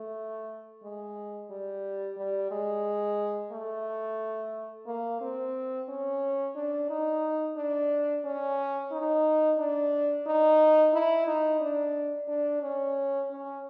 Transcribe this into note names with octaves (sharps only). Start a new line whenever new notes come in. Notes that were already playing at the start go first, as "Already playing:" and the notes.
Already playing: A3
G#3
G3
G3
G#3
A3
A#3
C4
C#4
D4
D#4
D4
C#4
D#4
D4
D#4
E4
D#4
D4
D4
C#4
C#4